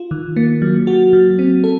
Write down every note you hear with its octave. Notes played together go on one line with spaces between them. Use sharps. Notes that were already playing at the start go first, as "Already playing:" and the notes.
Already playing: F4
D#3
A#3
F#3
F#4
F#3
C4
A4